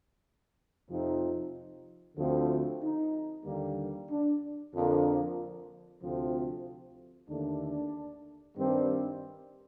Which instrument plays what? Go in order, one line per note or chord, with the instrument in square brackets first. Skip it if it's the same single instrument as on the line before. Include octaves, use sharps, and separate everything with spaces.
[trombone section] F2 C3 F3 C4 D#4
D2 D3 F3 A3 C4
D#4
D#2 D3 G3 A#3
D4
F2 D3 F3 A#3 D4
D2 C3 F3 A3 C4
D#2 D3 A3 D4
G2 D#3 G3 C4